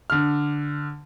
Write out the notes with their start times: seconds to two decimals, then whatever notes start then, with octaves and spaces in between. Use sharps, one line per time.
0.10 D3 F6